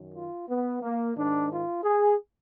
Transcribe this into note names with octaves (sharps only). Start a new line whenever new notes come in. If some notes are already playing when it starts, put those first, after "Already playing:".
Already playing: F#2 D#3
F4
B3
A#3
G#2 D#3 D4
F4
G#4